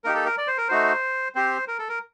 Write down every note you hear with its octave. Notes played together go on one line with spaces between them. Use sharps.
A#3 D#4 G4 A#4
A4
A#4
D5
C5
A#4
A3 D#4 F#4 C5
C4 G4 C5
A#4
A4
A#4